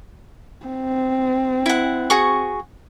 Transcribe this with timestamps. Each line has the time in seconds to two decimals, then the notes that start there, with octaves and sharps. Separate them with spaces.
0.67 C4
1.66 E4 F#5
2.10 F#4 G#4 C#6